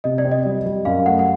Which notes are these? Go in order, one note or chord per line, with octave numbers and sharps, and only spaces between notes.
C3 D#5
D5
C4
D#5
G3
G3
F#2 F5
A3 F#5
F#5